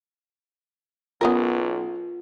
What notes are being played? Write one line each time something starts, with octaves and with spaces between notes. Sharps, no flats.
B1 B3 C#4 F4 A#4